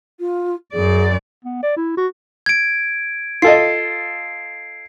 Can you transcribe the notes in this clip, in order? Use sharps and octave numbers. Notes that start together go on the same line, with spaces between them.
F4
F#2 G#4 D5
B3
D5
E4
F#4
G#6 D7
F4 A4 D#5 C7